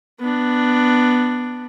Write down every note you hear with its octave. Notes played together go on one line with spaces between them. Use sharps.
B3 D4